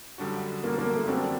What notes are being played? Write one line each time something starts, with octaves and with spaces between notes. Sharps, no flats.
F#2 D3 G3 D4 F#4
F#2 D3 G3 A#3 D4 F#4
A#3
A3
F#2 D3 G3 C4 D4 F#4